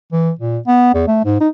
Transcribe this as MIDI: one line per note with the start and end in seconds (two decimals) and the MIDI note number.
0.12 0.31 52
0.39 0.58 46
0.67 0.93 59
0.94 1.03 40
1.07 1.23 57
1.24 1.39 44
1.40 1.48 63